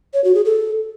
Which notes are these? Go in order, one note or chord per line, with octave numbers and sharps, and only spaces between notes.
C#5
F#4
G#4
A4